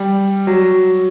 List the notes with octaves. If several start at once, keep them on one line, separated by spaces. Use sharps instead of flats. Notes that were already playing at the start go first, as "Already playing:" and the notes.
Already playing: G3
F#3